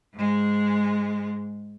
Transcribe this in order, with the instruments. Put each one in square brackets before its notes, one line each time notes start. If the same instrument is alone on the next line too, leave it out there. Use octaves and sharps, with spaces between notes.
[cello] G#2 G#3